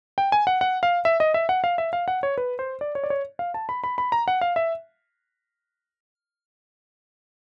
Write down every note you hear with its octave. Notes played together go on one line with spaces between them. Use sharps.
G5
G#5
F#5
F#5
F5
E5
D#5
E5
F#5
F5
E5
F5
F#5
C#5
B4
C5
D5
C#5
D5
C#5
F5
A5
B5
B5
B5
A#5
F#5
F5
E5